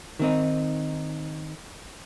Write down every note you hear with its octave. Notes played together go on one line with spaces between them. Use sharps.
D#3 C4 D#4